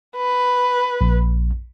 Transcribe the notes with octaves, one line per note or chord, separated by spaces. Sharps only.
B4
A#1